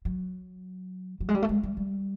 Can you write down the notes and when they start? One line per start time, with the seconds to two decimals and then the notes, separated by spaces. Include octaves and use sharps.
0.05 F#3
1.20 F#3
1.29 G#3
1.35 G3
1.42 A3
1.49 G#3
1.63 G3
1.77 G3